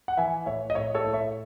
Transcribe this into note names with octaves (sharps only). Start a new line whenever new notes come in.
F#5
E3 E5 G#5
A2 C#5 E5
D#5
A2 C#5 E5
A4 C#5
A2
C#5 E5